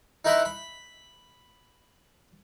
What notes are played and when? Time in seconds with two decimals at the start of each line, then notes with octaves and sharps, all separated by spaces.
0.25 D#4 E4 A#4 B4 B5 C6
0.45 B5